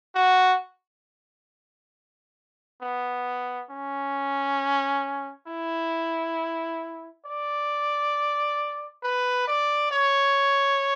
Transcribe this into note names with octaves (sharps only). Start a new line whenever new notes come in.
F#4
B3
C#4
E4
D5
B4
D5
C#5